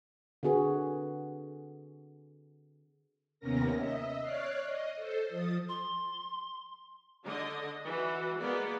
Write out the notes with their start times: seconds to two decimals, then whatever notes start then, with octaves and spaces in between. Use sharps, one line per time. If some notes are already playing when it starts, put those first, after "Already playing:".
0.43 D3 C4 F#4 G#4 B4
3.40 D#2 C3 B3 C#4 A#4 A#6
3.75 D#5 E5
4.20 C#5 D5 F6 F#6 C7
4.66 D#5
4.96 A4 C5
5.29 F3 D#6 A6
5.69 C6
7.24 D3 D#5
7.85 E3 F#4
8.41 G#3 A#3 B3 D5